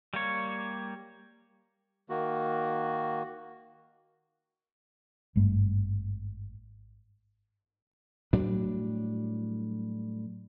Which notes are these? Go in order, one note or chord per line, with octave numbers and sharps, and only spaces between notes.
G3 A#3 C#5
D#3 A#3 F#4
G#1 G2 G3 A3
A2 F#3 G3 D4